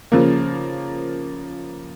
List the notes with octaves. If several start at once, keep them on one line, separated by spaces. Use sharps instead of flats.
C#3 F3 A#3